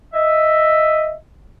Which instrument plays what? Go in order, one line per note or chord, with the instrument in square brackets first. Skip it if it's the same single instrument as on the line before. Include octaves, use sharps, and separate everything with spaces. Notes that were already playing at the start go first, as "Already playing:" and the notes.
[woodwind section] D#5 E5